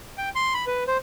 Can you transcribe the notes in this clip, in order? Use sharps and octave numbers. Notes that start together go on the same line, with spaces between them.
G5
C6
B5
B4
C5